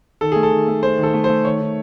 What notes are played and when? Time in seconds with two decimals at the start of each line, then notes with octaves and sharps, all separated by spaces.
0.21 D#3 A4
0.32 A3 G#4
0.43 A4
0.51 D#3
0.68 A3
0.83 A3 C5
0.98 D#3
1.03 A4
1.14 A3
1.24 C5
1.29 A3
1.45 D#3 C#5
1.61 D#3